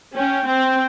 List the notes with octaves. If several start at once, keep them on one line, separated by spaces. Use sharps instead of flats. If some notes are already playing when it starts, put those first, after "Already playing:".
C#4 G5
C4 G5